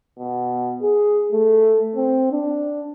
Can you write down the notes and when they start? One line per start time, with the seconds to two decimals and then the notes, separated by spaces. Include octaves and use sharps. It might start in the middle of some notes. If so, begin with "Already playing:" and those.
0.19 B2
0.82 G#4
1.32 A3
1.96 C4
2.31 D4